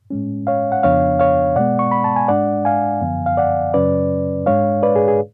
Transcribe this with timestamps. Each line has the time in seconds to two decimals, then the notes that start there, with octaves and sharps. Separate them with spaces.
0.10 A2 G#3 C#4
0.47 C#5 F5
0.72 F#5
0.83 F2 C#3 F3 B3 D4 C#5 F5
1.19 C#5 F5
1.56 B2 G#3 B3 D5 F#5
1.79 C#6
1.91 B5
2.04 A5
2.16 G#5
2.28 G#2 G#3 D4 D5 F#5
2.65 F5 G#5
3.01 F#2 D3 F3 B3
3.26 F5
3.37 D5 F#5
3.74 F#2 C#3 F#3 C#4 B4 D5
4.46 G#2 G#3 D4 C#5 F5
4.83 B4 D5
4.96 G#4
5.08 G#4